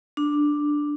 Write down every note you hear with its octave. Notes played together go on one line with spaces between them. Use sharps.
D4